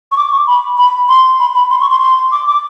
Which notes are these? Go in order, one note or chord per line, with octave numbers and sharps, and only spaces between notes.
C#6
D6
C#6
B5
B5
C6
B5
B5
C6
C#6
C6
C6
D6
D6